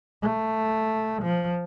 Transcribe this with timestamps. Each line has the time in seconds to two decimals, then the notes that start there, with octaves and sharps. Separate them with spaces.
0.22 A3
1.22 F3